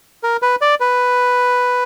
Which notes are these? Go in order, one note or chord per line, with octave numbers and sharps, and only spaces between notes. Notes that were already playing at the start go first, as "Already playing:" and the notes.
A#4
B4
D5
B4